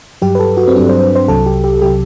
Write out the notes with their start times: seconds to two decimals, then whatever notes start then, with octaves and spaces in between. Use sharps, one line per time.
0.22 G2 F#3 G4
0.35 B4
0.39 A4
0.57 F#4
0.68 C4
0.75 G2 F#3 D4
0.89 C5
1.15 C5
1.28 C2 C3 F#3 A4
1.46 G4
1.64 G4
1.82 C3 F#3 G4